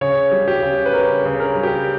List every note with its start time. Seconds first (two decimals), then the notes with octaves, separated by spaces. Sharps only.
0.01 C#3 C#5
0.31 G3
0.48 G4
0.62 C#3
0.86 B4
0.93 C#4 A#4
1.25 C#3
1.40 A#4
1.55 G3
1.63 G4